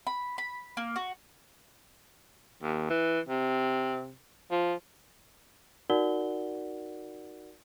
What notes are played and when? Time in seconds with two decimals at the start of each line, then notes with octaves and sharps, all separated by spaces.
0.07 B5
0.38 B5
0.77 A#3
0.96 F#4
2.63 D#2
2.90 E3
3.29 C3
4.51 F3
5.90 D#4 F#4 A#4 D5 F#5 G7